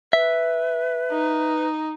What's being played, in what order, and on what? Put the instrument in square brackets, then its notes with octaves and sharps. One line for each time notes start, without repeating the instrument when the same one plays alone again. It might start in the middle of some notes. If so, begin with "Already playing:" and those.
[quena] B4 [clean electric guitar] E5
[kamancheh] D#4